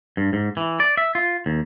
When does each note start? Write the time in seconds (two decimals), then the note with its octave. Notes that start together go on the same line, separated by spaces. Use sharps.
0.17 G2
0.33 G#2
0.57 E3
0.80 D5
0.97 E5
1.15 F4
1.46 D#2